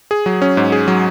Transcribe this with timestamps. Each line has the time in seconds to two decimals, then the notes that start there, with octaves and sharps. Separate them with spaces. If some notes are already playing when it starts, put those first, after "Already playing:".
0.11 G#4
0.26 F#3
0.42 C#4
0.57 G#2
0.72 G#4
0.88 F#3